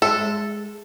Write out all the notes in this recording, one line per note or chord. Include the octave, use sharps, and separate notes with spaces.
G#3 A4 E5